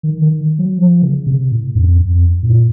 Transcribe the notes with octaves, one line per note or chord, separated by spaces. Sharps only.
D#3
D#3
F#3
F3
C#3
C3
A2
F2
F2
F#2
A#2